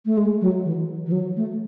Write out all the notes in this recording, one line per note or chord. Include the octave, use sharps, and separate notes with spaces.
A3
G#3
F#3
E3
E3
F#3
A3